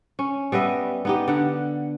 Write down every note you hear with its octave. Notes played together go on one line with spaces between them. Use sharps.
C#4
G3 B3 D#5 E5
B3 D#4 G4
D3 F#5